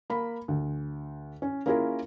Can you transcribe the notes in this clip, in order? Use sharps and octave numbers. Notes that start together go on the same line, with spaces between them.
A#3 B5
D2
C#4
A#3 C#4 E4 F4 G#4 A#4